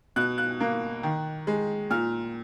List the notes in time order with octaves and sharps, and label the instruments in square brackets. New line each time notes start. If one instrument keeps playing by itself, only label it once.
[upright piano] B2 F#6
F#6
A#3
D#3
G#3
A#2 F6